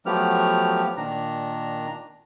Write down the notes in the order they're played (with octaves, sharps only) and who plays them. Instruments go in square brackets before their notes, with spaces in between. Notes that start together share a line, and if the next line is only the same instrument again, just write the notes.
[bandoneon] F3 F#3 A3 B3 G4 F6
A#2 D#3 D4 A#5